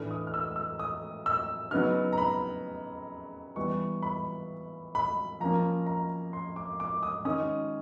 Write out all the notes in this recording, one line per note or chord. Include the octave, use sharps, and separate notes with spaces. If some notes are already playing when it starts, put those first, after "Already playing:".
Already playing: A2 E3 A3 D4 F6
D#6
F6
E6
E6
D#6
E6
C#3 F#3 B3 D#4 F6
A#5
B5
E3 G3 B3 C#6
B5
B5
F3 A#3 C#4 A#5
A#5
C6
D6
D6
D#6
D#3 G#3 C#4 D#6